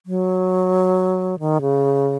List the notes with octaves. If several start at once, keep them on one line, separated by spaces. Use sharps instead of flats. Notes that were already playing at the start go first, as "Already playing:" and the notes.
F#3
D#3
C#3